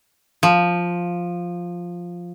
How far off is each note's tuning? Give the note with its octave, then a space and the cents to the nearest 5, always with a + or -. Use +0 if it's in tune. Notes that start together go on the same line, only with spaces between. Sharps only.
F3 +5